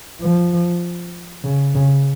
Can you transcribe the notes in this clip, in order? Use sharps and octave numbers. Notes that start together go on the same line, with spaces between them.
F3
C#3
C#3